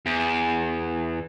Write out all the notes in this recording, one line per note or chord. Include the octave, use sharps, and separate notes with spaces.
E2